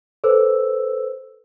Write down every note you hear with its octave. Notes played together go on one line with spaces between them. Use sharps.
A4 B4 C5 E6